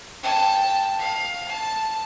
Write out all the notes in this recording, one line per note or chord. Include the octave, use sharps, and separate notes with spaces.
G5 A5
F5
A5